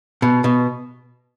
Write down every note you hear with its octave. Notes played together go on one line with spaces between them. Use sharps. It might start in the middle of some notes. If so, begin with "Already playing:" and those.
B2
B2